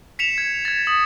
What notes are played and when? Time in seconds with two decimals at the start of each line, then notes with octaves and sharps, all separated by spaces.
0.19 B6 C#7 E7 F7
0.38 G#6
0.65 G#6 A6
0.87 D#6